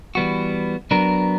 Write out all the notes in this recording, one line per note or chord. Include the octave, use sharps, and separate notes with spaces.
E3 G3 B3 F#4
F#3 B3 D4 A#4